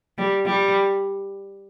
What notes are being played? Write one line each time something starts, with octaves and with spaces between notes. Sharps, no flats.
G3
G3